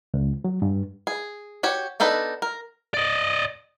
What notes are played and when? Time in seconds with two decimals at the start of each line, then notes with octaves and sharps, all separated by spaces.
0.14 C#2
0.44 F#3
0.62 G2
1.07 G#4
1.63 F#4 G4 C#5
2.00 B3 D4 D#4 A4 B4
2.42 A#4
2.94 D5 D#5